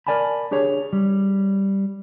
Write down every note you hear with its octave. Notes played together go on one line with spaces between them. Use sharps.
A#4 C5 D5 G#5 A5 B5
D4 G4 G#4 C#5
G3